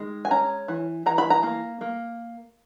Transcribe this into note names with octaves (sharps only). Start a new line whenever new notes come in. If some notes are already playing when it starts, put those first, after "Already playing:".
Already playing: D#3 G#3
G#5
C#4 A#5
E3
E3 A#5
B5
A#5
A#3
A#3